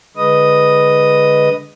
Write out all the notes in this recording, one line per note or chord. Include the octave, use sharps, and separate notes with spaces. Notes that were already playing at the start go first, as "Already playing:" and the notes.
D3 G#3 B4 D#5 D#6